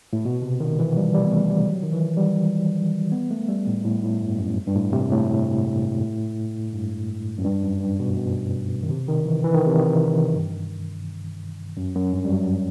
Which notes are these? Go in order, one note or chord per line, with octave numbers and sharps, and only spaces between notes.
A2
B2
C3
D#3
E3
G3
G3
B3
A3
G3
F#3
D#3
E3
G3
B3
A3
G3
A2
A2
A2
G2
F#2
G2
A2
C3
A2
G2
F#2
G2
F#2
G2
B2
B2
D#3
C3
D#3
E3
E3
D#3
C3
D#3
G2
F#2
F#2
G2
G3
F#3